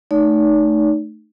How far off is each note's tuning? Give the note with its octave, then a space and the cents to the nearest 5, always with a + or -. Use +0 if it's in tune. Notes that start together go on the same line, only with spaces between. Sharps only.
A3 +0 D#4 -20 D5 -45